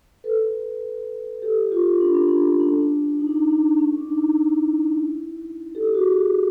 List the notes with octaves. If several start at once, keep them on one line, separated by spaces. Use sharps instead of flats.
A4 B4
G4 A4
F4 G4
D4
C#4
D4
D4
D#4
D4
D#4
D4
C#4
D4
D#4
E4
G4 A4
F#4 G#4